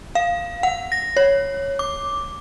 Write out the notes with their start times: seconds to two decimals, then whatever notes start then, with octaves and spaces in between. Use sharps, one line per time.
0.15 F5
0.63 F#5
0.92 A#6
1.17 C#5
1.79 D6